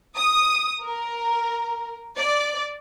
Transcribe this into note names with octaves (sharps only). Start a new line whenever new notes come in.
D#6
A#4
D5